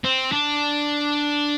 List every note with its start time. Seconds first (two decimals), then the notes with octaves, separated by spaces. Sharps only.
0.04 C4
0.32 D4